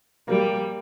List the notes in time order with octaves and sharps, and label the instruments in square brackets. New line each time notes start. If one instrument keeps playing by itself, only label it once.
[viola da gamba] G3 [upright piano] A#3